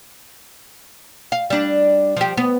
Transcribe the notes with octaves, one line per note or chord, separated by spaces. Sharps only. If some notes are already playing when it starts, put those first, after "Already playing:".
F5
G3 D4
F3 G4
B3